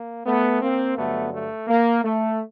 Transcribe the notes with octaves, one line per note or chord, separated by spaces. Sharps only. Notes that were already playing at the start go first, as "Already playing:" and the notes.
Already playing: A#3
A3 B3
A#3 C4
G2 D3 F#3 A3 B3
A3
A#3
A3